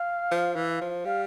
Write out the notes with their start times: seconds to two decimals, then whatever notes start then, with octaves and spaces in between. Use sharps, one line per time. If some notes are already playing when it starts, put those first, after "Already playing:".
Already playing: F5
0.31 F3
0.56 E3
0.81 F3
1.05 G3 F5